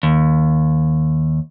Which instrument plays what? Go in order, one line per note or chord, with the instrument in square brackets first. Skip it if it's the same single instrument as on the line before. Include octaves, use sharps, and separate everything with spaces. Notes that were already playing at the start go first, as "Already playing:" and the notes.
[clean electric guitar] D#2